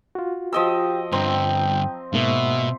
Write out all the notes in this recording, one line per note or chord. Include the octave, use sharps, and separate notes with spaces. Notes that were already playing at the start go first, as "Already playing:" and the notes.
F4 F#4
F3 G4 D#5 E6
G2 D3 C4 G5 A#5
G#2 B2 A#3 E5